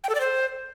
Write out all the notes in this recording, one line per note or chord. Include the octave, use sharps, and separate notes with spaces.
G5
A4
D5
C5